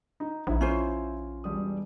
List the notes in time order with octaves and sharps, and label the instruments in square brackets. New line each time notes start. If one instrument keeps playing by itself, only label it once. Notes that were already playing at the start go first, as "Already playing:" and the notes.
[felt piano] D#4
[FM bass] A#1 [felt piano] D#4 E4
[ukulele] C#4 F4 C5
[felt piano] E1 G3 D#6